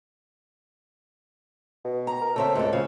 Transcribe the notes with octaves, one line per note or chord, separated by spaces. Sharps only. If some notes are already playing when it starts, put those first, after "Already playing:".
B2
A#5
A#4
C#3 C4 A4 E5
C#2 G#2 A3 A4
C#3 F3